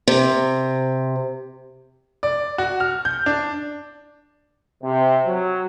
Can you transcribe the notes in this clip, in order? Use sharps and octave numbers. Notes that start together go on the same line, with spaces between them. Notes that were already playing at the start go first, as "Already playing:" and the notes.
C3
D5
F#4
F6
G6
D4
C3
F#3